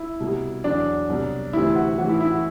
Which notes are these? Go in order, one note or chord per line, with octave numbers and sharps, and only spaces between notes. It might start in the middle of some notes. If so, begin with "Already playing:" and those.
Already playing: E4
C2 B2 G3
E2 B2 F#3 D4
C2 B2 F#3
D2 C3 E3 G3 E4
F#4
A2 E3 G3 F#4
E4
E4
F#4